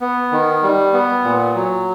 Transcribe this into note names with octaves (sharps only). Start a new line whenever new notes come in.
B3
D#3
G3
B3
A#2
F#3